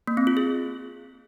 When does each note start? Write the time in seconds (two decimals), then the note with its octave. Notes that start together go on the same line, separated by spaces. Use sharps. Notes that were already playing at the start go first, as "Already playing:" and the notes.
0.07 A#3
0.17 C4
0.27 F4
0.37 G#4